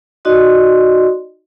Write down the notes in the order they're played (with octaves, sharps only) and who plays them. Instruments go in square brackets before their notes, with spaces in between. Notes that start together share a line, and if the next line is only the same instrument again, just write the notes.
[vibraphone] D#4 F#4 D5 D#5 C6